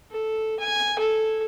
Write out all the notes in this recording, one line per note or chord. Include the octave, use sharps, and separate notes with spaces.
A4
G#5
A4